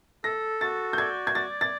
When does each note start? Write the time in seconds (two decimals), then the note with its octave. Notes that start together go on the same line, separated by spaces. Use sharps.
0.24 A4 A#6
0.61 F#4 A6
0.93 G6
0.98 D5 G#6
1.27 G#6
1.35 D5 A6
1.61 A6